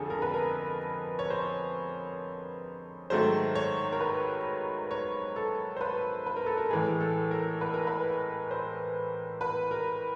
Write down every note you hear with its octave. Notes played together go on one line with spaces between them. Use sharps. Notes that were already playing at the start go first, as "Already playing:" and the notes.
Already playing: F2 D3 F3 G#3 G#4 A4
A#4
B4
A#4
C#5
C5
G#2 D#3 F#3 A3 C5
C#5
A#4
B4
C#5
A4
C5
B4
B4
A#4
A4
A#4
A2 E3 G#3 G#4
A4
A#4
B4
A#4
B4
C5
B4
A#4